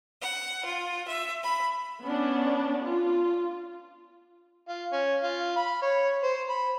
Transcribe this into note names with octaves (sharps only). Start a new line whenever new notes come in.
F#5
F4
E5
B5
B3 C#4 D4
F4
F4
C#4
F4
B5
C#5
C5
B5